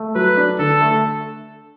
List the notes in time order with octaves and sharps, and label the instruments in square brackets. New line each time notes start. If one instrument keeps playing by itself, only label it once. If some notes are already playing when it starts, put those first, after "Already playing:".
Already playing: [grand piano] A3
[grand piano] F#3 [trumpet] B4
[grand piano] D4
[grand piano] D3 [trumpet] A4
[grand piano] A3